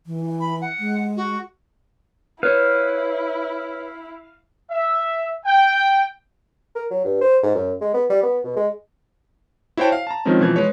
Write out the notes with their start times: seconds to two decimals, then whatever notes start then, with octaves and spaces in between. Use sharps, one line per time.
0.06 E3
0.40 B5
0.61 F#5
0.79 G#3
1.17 F#4
2.43 E4 B4 C#5 F5
4.71 E5
5.45 G5
6.75 A#4
6.91 F#3
7.05 G2
7.21 C5
7.43 G#2
7.55 F#2
7.81 G#3
7.94 B3
8.10 G3
8.23 B3
8.44 B2
8.56 G#3
9.77 E4 F#4 C5 C#5 G5 A5
9.92 F5
10.07 A5 A#5
10.25 D#3 F3 G#3 C4 C#4
10.40 B2 E3 F3 G#6
10.56 G#3 B4 C#5